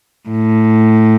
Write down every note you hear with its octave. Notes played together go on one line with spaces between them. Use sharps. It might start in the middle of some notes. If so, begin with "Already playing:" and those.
A2